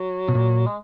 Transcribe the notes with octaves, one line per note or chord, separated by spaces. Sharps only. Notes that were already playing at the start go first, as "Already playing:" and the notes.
Already playing: F#3
B2
A#2
G#3